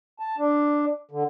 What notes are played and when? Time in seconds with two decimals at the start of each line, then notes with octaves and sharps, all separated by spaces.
0.20 A5
0.38 D4
1.11 D3